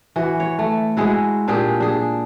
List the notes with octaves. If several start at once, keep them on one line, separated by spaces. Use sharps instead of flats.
E3 F#4
C#5
A3
G#3 E4 F#4
A#2 D4 G4 G#4
D4 G#4